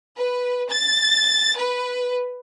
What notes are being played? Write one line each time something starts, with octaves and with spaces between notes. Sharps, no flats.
B4
A6
B4